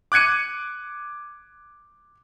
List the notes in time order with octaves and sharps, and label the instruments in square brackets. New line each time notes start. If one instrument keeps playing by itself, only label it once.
[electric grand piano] D6 F#6 G#6 C#7 D#7